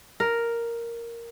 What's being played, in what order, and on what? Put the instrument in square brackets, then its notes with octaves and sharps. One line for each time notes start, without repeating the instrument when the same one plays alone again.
[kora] A#4